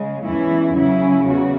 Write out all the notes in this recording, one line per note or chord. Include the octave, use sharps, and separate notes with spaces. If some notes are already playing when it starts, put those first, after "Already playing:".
Already playing: C#3 G#3
E2 E3 C#4 E4
C#3 F#3 C#4 E4
E2 C#3 F#4